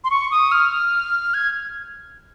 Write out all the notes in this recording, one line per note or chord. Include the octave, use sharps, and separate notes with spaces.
C6
C#6
D#6
F6
G#6